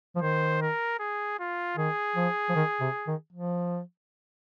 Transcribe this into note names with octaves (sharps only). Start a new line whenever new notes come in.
F3
D#3 C5
A#4
G#4
F4
D#3 G#4
F3
F3
D#3
C3
D#3
F3